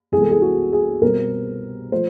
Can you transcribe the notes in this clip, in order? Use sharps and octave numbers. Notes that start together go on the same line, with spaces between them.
C2 C3 E3 G#3 B3 G#4
A4
G#4
F#4
G#4
B2 G3 C4 A#4
F3 A3 C5